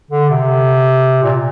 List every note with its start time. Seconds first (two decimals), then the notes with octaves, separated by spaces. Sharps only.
0.11 D3
0.30 C3
1.23 A#2